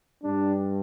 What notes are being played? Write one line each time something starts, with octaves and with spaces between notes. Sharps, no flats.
G2 G3 D4